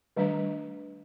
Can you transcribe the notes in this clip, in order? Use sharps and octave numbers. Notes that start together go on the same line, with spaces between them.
D#3 G3 A3 D4 B4 A#5